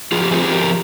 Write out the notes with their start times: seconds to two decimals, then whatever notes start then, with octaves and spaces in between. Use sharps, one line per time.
0.12 F3 F4 G#4
0.23 G4
0.32 C4 F4 G#4
0.43 G#4
0.52 F3 G4 A#4